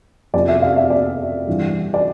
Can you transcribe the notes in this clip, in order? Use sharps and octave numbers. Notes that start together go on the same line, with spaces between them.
F2 C3 F3 D5
E5
F5
E5
D5
G2 E3 G3
D5